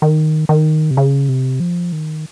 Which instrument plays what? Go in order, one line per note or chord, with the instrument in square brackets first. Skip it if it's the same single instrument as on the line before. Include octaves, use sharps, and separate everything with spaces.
[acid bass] D#3
D#3
C3
C#3
C3
F3
D#3